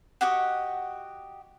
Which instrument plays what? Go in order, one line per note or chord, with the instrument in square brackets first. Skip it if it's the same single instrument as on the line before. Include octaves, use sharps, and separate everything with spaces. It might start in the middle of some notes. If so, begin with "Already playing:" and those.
[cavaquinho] F#4 G4 D#5 F#5